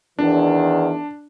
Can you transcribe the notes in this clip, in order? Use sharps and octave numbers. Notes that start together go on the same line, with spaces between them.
E2 D#3 D4